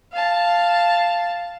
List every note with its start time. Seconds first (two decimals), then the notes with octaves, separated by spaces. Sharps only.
0.12 F5 A5